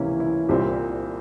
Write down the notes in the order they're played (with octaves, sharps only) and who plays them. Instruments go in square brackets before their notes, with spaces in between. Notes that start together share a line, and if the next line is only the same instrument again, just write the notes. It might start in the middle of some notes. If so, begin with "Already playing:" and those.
Already playing: [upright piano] C#2 C3 E3 A#3 C#4 E4
E4
C2 A#2 G3 C4 G4